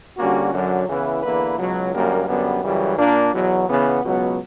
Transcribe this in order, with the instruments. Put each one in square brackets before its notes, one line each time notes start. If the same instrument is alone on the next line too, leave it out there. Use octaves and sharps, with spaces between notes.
[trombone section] D3 G3 A#3 C#4 F#4
F#2 D3 F#3
C#3 E3 B3 E4 B4
E2 D3 A#3 E4 B4
C#2 B2 F#3
F#2 D3 G3 A#3
F#2 D3 G3 B3
F#2 C#3 E3 G3
A#2 A#3 D4
E2 B2 F#3
C#3 E3 B3
C#2 B2 F#3 B3